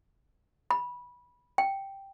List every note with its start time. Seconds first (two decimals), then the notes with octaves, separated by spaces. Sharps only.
0.71 B5
1.58 G5